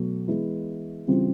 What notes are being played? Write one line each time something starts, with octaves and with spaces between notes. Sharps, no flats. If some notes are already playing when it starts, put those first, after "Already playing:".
Already playing: B2 F#3 A3
E3 G#3 B3 E4
C#3 E3 G3 C4 F4